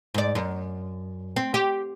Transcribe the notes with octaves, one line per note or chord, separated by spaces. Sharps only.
G#2 D5
F#2
C4
G4